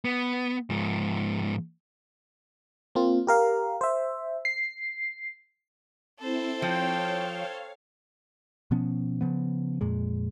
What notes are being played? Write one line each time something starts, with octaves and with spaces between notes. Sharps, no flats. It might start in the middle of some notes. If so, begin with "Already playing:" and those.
B3
G#2 F3
A#3 C4 F4
G4 A#4 F5
C5 E5
C7
C4 E4 A4 C5
F3 C4 C#5 F5 G5
B2 F3 B3 C#4
C#3 F3 B3
F2 A#2 G#3